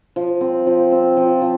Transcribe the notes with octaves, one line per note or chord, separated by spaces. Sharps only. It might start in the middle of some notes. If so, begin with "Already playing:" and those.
F3
C4
F3
C4
F3
F3